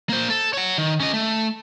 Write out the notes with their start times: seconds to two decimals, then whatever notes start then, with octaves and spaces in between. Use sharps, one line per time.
0.09 A#3 C5
0.30 A4
0.53 C#5 F#5
0.78 D#3
1.00 C#4 D#5
1.14 A3